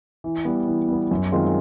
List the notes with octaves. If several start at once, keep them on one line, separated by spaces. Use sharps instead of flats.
E3
G3 B3
E3
G3 B3
F#2
D#3 G#3 C4 F4